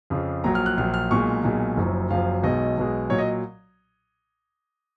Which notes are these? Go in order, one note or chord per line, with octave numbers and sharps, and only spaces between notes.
F2 C#3 F3
A#1 A#2 F#3 A#5
F6
F#6
A#1 A#2 F#3 F6
F6
B1 A#2 G#3 C#6
B1 A#2 G#3
F#1 F#2 F3
F#1 F#2 F3 F5
B1 B2 G#3 D#5
B1 B2 G#3
A#2 F#3 C#5
D#5